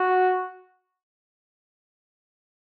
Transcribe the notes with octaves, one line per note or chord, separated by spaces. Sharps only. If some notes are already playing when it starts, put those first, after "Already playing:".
Already playing: F#4